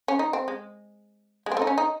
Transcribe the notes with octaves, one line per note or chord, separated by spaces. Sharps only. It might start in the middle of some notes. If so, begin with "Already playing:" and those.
C#4
D#4
C4
G#3
G#3
C4
A3 D#4
C#4
D#4